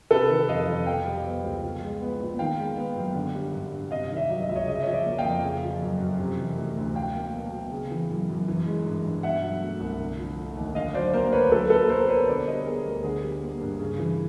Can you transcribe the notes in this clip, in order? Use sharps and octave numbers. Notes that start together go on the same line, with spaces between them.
C3 A4 B4
D#3
F2 D#5 F5
F2
B2 F5 G5
G3
B3
C#2
F3
G#3
B3
A#2
D#3 F5 G5
G#3
B3
F#2
D3
G3
G2
G2
C3 D#5 F5
D#3
D5 E5
F#3
D#5
C#2 E5
C#5 D#5
C#3 D#5
E5
C#5 D#5
F3
D5 E5
A#3
F5 G5
F2
C#3
F3
F#2
F#2
C3
E3
A3
D2
F#3 F5 G5
A#3
B2
B2
C#3
E3
F#2
F#2
E3
G#3
G2
G2
B2 E5 F#5
F#3
A3
C2
D3
F3
A3
D#2
D3 D#5 F5
F#3 C5 D5
A#3 A#4 C5
D2 B4 C#5
F#3 A4 B4
A#3 A4 B4
B2 A#4 C5
B2 B4 C#5
D3 C5 D5
G3 C#5 D#5
B3 G#4 A#4
D2
D3 G#4
G3
A#3
G2
C#3
E3